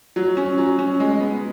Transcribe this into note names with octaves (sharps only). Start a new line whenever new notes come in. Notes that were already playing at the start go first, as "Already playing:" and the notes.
F#3
C#4
F#3
C#4
G#3
B3